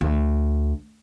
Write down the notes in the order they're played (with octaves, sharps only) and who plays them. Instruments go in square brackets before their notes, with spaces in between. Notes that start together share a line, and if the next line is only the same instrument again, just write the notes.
[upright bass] D2